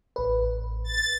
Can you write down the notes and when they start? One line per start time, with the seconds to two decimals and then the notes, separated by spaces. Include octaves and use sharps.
0.16 A1 B4
0.84 A6